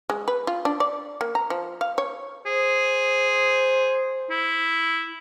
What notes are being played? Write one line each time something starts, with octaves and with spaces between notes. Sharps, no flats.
G#3
B4
F4
D4
D5
A#3
A#5
F3
F5
C#5
G#4 C5
E4